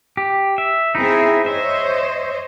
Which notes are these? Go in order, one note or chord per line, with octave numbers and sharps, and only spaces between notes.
G4
E5
C4 D#4 E4 G#4 E5
C5 C#5 D#5 E5